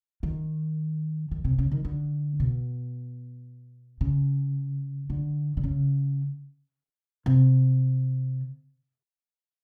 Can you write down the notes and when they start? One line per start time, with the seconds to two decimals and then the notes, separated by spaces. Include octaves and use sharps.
0.23 D#3
1.31 D#3
1.44 C3
1.58 C#3
1.71 D#3
1.85 D3
2.40 B2
4.01 C#3
5.10 D3
5.57 D3
5.64 C#3
7.26 C3